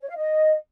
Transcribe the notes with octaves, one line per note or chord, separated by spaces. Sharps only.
C#5
F5
D#5